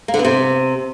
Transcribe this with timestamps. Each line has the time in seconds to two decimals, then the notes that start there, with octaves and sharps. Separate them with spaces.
0.08 A#3
0.14 D3
0.19 B3
0.25 C3